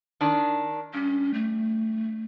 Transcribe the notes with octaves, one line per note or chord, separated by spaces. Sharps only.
D#3 D4
G2 C#4
A3